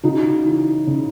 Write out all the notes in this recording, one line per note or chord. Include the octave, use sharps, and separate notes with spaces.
C#3 D#4 F#4
E3
C#3